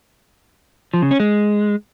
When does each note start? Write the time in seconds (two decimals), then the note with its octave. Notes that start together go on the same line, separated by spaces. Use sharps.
0.94 F3
1.02 C#3
1.11 C#4
1.20 G#3